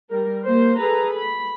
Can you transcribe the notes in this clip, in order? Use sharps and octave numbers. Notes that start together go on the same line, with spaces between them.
G3 A#4
A#3 C5
G#4 A4 B4 A#5
B5